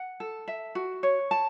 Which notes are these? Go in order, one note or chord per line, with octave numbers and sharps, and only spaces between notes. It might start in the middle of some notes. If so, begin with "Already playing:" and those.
Already playing: F#5
A4
E5
F#4
C#5
A5